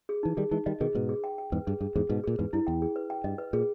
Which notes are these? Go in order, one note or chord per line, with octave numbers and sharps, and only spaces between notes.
G#4
E3 D#4
D#3 G3 G#4
E3 G#3 D#4
D#3 G3 D#5
B2 D#3 G#4
G#2 B2 B4
G#4
G5
G5
E2 G#2 B4
G2 G#4
G2 G#4
E2 G#2 G#4
G#2 B2 B4
A#2 G#4
E2 G#2 B4
G2 E4
E2 G5
G#4
B4
G5
G2 D#5
B4
A#2 G#4